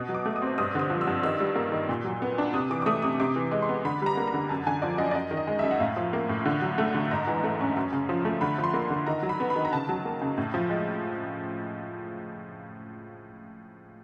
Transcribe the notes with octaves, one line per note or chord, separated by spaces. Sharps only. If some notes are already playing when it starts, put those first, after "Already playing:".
Already playing: B2 D#6
F#3
D6
A3
D#6
C4
G2 D#6
D3 D#6
F3
E6
G2
D#3 E6
G3
A#3
D#3
A#2
F#3
B3
D4
C3 D#6
E3 D6
D6
A3 D#6
C3 D#6
C3 D6
E3
G#3
C6
B3
D3 B5
G3 A#5 B5
A#3
A#5
D3
F#2 A5
D3 G#5
F3 D5
F#2 D#5
D5
F#2 D#5
D#3
D#5
G#3
F#2 E5
F#5
A2 F5
F3
A#3
A2
D3
F#3
A3
D3
G#2 A#5
E3
A3
C#4
F#2
C#3
F3
A3
D3 B5
F3
C6
A#3
B5
D3
D#3 A#5
F#3
B5
B3
B5
D#3
A#5
C#3 A5
F#3
A#3
C#3
A2
F3
G#3